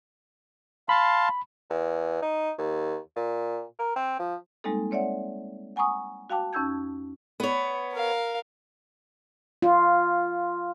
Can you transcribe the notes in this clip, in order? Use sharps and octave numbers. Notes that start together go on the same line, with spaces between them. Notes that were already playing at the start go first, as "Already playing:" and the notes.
F5 A5 B5 C6
E2
D#4
D#2
A#2
A#4
C4
F3
G3 G#3 A#3 C4 D#4 A4
C4 C#5 D5 E5 F#5
F#5 G#5 A#5 C#6 D#6
F#4 F5 G5 A5 D6
F2 C#4 D#4 E6 G6 G#6
B3 C#5
A#4 F5
F4